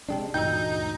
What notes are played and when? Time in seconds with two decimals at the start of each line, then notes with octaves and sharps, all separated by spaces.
0.08 C3 G#3 D4 D5 G5 A5
0.34 D2 G2 A#2 E3 D#4 G6